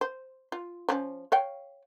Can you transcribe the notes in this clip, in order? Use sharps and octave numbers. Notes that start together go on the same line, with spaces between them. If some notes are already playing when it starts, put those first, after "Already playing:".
C5
F4
F3 C#4
C#5 F5 G5